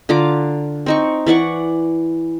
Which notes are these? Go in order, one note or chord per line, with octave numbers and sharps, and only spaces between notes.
D3 F4 A#5 D6
C4 D#4 C#6
E3 D5 F#5 C#6